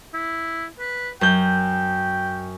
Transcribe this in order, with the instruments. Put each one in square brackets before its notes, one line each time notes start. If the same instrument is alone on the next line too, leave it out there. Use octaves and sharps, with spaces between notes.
[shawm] E4
B4
[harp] F#2 G6 [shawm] G5